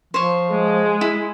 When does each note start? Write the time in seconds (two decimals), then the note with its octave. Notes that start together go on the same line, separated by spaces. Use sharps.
0.14 F3 C5 C#5
0.49 G#3
1.01 E4